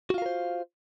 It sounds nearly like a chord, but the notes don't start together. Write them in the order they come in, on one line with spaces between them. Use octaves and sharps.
F#4 F4 F5 A#4 C5